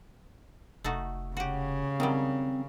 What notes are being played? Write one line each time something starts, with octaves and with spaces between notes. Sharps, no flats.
F1 A3 D#4 F#4
C#3 F#4 G4
D#3 F#3 G3 C4